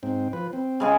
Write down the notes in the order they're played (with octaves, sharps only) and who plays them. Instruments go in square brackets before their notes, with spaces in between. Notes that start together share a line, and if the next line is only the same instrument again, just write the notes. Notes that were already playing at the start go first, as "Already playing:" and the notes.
[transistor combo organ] G#2 C4
F3 B4
C4
[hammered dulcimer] C#3 G#3 G#4